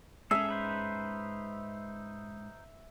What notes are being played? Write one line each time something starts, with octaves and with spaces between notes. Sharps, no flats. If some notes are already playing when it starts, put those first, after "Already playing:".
G#2 C#4 G#4 A4 E5
D#4 B4 C5